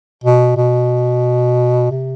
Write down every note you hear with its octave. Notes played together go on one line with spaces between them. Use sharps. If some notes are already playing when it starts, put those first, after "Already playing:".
B2
B2
C3